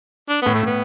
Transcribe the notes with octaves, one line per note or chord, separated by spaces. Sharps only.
D4
B3
A2
A3
A2 B3